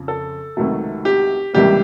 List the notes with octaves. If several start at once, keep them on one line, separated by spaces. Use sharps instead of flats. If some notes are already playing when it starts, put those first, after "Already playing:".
Already playing: F2 C#3 F3
A4
C#2 C3 D#3 F#3 A3
G4
C#2 C3 E3 G3 A#3 G4